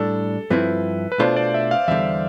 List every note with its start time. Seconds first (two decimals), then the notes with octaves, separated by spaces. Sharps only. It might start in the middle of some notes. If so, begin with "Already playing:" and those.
Already playing: A2 G3 D4 A4
0.50 G2 F3 C4 E4 B4
1.12 B4
1.19 B2 A3 D4 F4 C5
1.36 D5
1.54 E5
1.71 F5
1.88 E2 D3 G3 E5